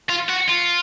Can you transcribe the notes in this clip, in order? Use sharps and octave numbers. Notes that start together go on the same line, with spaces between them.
F4
F#4
F4